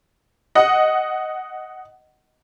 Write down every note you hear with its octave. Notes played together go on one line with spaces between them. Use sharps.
D#5 F#5